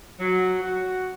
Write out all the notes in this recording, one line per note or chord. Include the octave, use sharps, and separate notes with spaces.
F#3
F#4